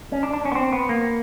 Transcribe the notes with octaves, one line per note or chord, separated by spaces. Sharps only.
C#4
D4
D4
C#4
B3
C4
B3
A#3